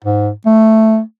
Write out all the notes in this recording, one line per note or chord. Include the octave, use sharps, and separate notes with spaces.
G#2
A3